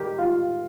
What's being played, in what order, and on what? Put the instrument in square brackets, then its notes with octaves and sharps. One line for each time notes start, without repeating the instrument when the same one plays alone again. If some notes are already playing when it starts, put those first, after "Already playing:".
Already playing: [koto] D#3 G3 G4 [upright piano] A#4
[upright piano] F4